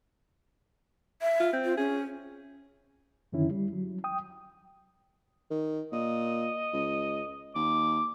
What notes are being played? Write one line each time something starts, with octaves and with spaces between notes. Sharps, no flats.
E5
F4
C4
F4
C#4 G#4
F#2 D3 D#3 C#4 E4
G3
F#3
G5 D#6
D#3
A#2 D#5
C#2
D#2 D6